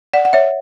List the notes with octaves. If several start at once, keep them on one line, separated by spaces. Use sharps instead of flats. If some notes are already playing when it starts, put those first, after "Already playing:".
D5 F#5
F#5
C#5 E5